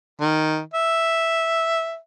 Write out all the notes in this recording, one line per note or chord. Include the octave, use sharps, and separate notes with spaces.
D#3
E5